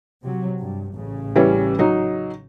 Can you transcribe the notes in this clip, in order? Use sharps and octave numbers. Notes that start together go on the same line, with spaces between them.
C3 F#3
G2
A1 C#3
E3 G3 C#4
F#3 D#4